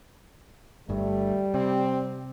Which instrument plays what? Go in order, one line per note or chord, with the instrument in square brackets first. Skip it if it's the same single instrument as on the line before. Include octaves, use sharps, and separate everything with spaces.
[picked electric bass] G1 G2 [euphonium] G3 [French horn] A3
[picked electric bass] C3 [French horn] C4